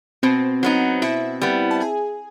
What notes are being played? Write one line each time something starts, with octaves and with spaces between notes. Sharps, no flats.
B2 C4 C5
F#3 B3 D#4
B2 E4 E5
G3 B3
A5
G#4 G#5